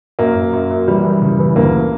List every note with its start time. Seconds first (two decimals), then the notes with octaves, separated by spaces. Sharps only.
0.19 F#2 A#3
0.36 F#2
0.53 F#2
0.70 F#2
0.88 E3 G3
1.05 E3
1.22 C#3
1.39 E3
1.56 D2 A#3